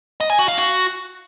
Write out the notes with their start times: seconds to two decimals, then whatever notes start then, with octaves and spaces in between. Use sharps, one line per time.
0.21 D#5
0.30 G#5
0.39 F#4
0.48 F5
0.57 F#4